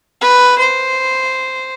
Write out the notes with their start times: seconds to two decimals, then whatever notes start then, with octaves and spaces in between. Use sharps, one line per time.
0.21 B4
0.58 C5